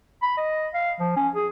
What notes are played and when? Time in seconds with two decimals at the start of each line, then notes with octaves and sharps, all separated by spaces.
0.22 B5
0.37 D#5
0.74 F5
1.00 F3
1.16 C#4
1.35 G#4